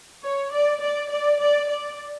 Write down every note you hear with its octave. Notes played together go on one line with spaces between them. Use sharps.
C#5
D5
D5
D5
D5
D5